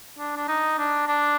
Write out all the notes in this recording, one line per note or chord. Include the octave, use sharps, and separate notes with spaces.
D4
D4
D#4
D4
D4